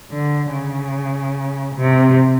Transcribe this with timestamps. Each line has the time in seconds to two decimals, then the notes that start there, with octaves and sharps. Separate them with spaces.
0.11 D3
0.53 C#3
1.76 C3